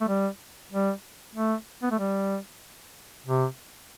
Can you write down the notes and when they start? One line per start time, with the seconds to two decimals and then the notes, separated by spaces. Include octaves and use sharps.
0.01 A3
0.08 G3
0.72 G3
1.35 A3
1.83 B3
1.91 A3
1.99 G3
3.26 C3